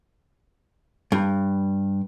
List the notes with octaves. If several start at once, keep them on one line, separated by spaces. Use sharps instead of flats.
G2